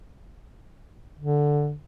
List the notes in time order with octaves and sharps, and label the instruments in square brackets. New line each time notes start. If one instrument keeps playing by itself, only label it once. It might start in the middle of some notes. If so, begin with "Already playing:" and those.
[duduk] D3